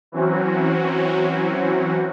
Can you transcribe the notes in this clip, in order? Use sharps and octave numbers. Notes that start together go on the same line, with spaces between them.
E3 F#3 C4 C#4 F#4